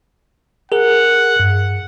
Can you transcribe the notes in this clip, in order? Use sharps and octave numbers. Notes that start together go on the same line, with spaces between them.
G#4 A#4 F#5
G2